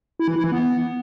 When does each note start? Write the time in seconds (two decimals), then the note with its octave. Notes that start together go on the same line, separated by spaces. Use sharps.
0.20 E4
0.28 E3
0.36 E4
0.44 E3
0.52 B3